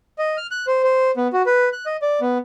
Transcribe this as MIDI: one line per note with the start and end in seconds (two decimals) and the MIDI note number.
0.18 0.37 75
0.37 0.47 89
0.51 0.66 90
0.67 0.83 72
0.83 1.11 72
1.17 1.28 59
1.33 1.42 66
1.46 1.69 71
1.73 1.85 90
1.86 1.97 75
2.02 2.20 74
2.21 2.38 59